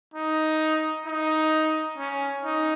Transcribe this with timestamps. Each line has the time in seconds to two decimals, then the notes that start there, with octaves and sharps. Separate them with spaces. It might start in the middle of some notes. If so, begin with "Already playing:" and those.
0.14 D#4
1.06 D#4
1.98 C#4
2.44 D#4